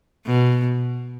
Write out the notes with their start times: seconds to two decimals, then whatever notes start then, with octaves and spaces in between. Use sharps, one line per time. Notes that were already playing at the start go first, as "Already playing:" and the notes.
0.26 B2